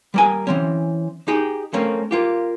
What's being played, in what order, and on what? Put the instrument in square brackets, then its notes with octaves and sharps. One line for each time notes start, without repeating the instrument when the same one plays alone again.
[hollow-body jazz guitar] G3 A#3 G#5
E3 C4 C#4
D#4 G4 G#4
A3 A#3 C4 C#4
A#3 F4 G4